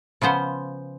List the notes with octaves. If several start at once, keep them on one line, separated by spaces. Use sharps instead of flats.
C#3 F3 B3 C5